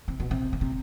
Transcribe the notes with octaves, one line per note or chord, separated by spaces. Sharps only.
C3
B2
C3
C#3
C3